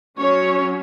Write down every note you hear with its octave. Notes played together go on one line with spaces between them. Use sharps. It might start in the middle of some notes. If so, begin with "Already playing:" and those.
F#3 C#4 C#5